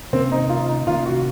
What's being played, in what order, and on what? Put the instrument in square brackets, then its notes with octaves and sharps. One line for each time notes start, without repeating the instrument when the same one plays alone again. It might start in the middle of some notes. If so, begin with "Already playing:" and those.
[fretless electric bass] C3 D#3 A#3 C#4 [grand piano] C4
[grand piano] D#4
F4
D#4
[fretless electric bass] C3 D#3 A#3 C#4 [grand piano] F4
[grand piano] F#4